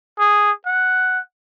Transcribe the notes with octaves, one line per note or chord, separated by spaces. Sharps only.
G#4
F#5